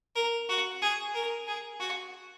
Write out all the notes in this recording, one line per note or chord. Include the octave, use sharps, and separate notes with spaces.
A#4
F#4
G#4
A#4
G#4
F#4